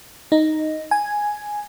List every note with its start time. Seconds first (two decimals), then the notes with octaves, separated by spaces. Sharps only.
0.32 D#4
0.91 G#5